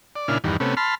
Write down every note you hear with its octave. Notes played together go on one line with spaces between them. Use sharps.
D5
A#2 C#3 D4 E4 F6
E2 G2 D#3
C3 A3 B3 C#4
A5 B5 C6 F6